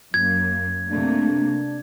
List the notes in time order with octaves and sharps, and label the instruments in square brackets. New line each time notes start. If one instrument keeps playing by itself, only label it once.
[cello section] F#2 A#3 [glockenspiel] G#6
[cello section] C3 A3 A#3 [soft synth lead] D4